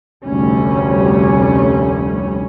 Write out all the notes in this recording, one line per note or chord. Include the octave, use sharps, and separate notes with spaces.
F1 D2 G3 C#4